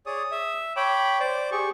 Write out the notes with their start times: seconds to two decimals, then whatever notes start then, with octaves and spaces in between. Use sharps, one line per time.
0.06 G#4 C#5 D5 D#6
0.31 E5
0.76 C#5 G5 B5 D6
1.20 C5 D5 D6
1.52 G4 G#4 C#6